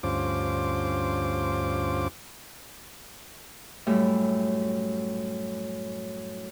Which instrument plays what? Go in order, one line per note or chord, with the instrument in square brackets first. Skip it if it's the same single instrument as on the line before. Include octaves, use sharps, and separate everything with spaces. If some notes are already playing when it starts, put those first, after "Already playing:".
[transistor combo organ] D2 G2 C#4 F4 C5 D6
[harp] F#2 A2 G3 A3 E5